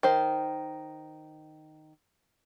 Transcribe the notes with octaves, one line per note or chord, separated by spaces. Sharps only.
D#3 C5